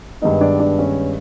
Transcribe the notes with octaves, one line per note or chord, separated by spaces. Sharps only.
G2 D#3 G#3 B3 D#4 D#5
D4 D5
D4 D5
C#4 C#5